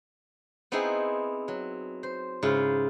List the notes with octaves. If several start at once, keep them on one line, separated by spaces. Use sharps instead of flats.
B3 C4 D#4 E4 G#4 C5
F#3
C5
G#2 C#3 E4 F4